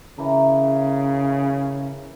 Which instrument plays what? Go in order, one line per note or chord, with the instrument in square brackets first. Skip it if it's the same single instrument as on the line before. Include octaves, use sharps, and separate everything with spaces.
[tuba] C#3 [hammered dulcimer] E3 A#4 A#5